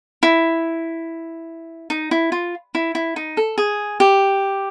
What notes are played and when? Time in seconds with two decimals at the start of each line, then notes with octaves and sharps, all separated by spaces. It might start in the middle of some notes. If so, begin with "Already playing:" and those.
0.23 E4
1.90 D#4
2.11 E4
2.32 F4
2.75 E4
2.95 E4
3.16 D#4
3.37 A4
3.58 G#4
4.00 G4